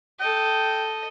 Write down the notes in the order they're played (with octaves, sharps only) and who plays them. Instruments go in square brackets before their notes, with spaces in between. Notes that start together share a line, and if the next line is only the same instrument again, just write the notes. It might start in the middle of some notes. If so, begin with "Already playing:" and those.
[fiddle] A4 D#5 [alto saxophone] G5